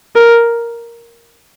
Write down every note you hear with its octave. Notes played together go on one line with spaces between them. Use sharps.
A#4